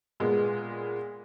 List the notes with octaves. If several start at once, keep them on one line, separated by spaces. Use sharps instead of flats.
A#2 G#3 B3